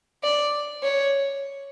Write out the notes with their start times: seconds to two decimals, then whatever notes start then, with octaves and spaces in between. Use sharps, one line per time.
0.24 D5
0.83 C#5